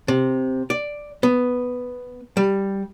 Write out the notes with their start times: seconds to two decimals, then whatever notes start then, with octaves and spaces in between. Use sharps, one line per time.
0.08 C3
0.70 D5
1.23 B3
2.37 G3